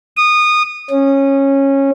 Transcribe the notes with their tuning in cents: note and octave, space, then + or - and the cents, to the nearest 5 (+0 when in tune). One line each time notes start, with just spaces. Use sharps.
D#6 -20
C#4 -15